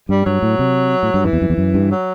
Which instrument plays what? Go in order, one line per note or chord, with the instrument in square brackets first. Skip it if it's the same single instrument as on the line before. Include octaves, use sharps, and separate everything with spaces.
[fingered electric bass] G2 [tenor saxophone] G3
[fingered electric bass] G2 [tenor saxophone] F#3
[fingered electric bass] A2
C3
A2
G2
[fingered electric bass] F#2 [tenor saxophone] E3
[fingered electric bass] E2
F#2
E2
F#2
G2
[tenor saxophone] F#3